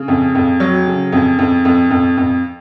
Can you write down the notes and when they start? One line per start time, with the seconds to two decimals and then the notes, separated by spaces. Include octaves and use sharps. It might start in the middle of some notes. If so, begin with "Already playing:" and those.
Already playing: C#3
0.08 F2
0.35 F2
0.60 F#3
0.87 C#3
1.12 F2
1.39 F2
1.65 F2
1.91 F2
2.17 F2